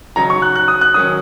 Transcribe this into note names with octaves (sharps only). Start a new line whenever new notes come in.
C#3 F#3 D#4 A#5
C#6
F#6
F#6
D#6
F#6
D#3 F#3 C#4 D#6